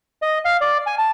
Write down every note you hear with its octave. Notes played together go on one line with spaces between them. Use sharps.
D#5
F5
D5
G#5
A5